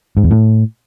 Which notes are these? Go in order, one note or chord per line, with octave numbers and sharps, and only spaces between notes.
G#2
E2
A2